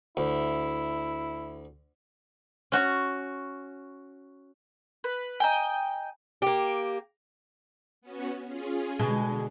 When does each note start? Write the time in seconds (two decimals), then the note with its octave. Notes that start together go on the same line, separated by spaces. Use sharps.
0.17 D2 E4
2.72 C#4 F#4
5.04 B4
5.40 D#5 G5 G#5 A#5
6.42 A#3 G4
8.02 B3 C#4 F#4
8.47 C#4 F4 G#4
8.99 B2 D3 G#3